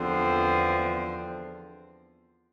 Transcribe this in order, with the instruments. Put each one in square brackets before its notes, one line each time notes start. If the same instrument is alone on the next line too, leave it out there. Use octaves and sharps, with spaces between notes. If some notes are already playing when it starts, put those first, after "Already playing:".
Already playing: [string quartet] E2 D3 F3 C4